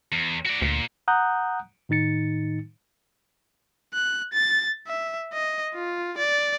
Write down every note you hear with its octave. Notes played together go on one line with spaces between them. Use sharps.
E2
F#4 D5
D2 A#2
F#5 A#5 D#6 F#6 G6
A2 D#3 D#4 A6 C#7
F#6
A6
E5
D#5
F4
D5